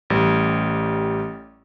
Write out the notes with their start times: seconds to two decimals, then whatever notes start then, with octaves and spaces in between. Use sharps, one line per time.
0.10 A1 G3